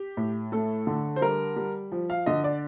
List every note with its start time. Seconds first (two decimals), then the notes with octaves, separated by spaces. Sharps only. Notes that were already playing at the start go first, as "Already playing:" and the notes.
Already playing: G4
0.17 A2
0.52 A3 A4
0.87 D3
1.16 C5
1.21 G3 A#4
1.56 G3
1.92 F3
2.10 F5
2.26 D3 D#5
2.44 D5